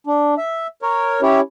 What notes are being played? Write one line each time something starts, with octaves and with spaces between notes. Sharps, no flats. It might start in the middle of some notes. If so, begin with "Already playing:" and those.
D4
E5
A#4 C#5
C#4 E4 G4 C#5